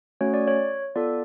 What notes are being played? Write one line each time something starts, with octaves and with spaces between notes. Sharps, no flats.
A3 C#4 F#4 C#5
D5
C#5
B3 F4 A4 D5